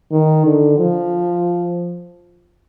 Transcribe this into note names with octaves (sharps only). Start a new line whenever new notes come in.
D#3
D3
F3